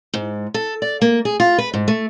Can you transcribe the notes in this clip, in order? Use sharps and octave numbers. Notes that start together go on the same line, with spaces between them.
G#2
A4
D5
A#3
G#4
F4
B4
G#2
A3